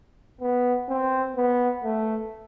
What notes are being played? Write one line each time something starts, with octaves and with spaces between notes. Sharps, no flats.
B3
C4
B3
A3